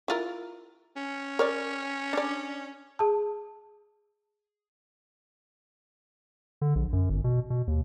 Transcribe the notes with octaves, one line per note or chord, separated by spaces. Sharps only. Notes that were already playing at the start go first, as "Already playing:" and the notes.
E4 F4 A#4
C#4
A#4 C#5 D5
D4 D5
G#4 A5
D3
A#1
F#2
G1
B2
B2
D#2